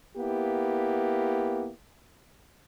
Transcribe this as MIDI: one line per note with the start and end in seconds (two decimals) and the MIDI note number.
0.17 1.69 58
0.17 1.69 59
0.17 1.69 64
0.17 1.69 67